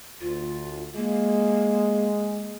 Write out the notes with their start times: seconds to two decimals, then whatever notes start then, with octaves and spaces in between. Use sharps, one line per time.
0.21 D2 F4
0.96 G#3 A#3